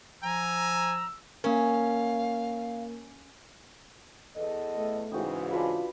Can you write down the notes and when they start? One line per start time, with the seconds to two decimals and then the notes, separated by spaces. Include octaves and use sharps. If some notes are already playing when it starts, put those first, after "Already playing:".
0.23 F3 G#5 A#5 E6
1.44 A#3 C#4 A#4 F5
4.36 E2 A4 D#5
4.78 A3
5.12 G#2 C#3 E3 F#4 G5 D#6
5.52 D4 F4 B4 B5